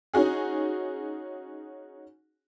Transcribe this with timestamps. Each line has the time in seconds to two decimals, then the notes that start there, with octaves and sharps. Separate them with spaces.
0.13 C#4 D#4 F#4 G#4